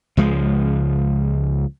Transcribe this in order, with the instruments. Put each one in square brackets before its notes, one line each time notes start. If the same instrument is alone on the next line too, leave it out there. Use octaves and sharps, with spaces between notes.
[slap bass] C#2 F3 G#3